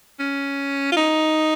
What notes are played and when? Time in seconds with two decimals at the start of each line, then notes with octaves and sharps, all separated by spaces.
0.20 C#4
0.92 F4
0.97 D#4